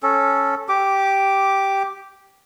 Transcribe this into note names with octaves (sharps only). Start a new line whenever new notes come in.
C#4 A4
G4 D6